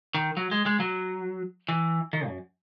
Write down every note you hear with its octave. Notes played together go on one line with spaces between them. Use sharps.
D#3
F#3
G#3
G#3
F#3
E3
D#3
F#2